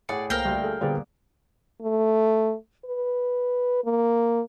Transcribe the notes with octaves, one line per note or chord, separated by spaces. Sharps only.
A2 G#4 D5 F#5 C#7
C2 A3 A#3 A#4 C5 F5 G5
D2 G3
G#4 A4
A#2 D3 G3 B3 G#4 C5 D5
A3
B4
A#3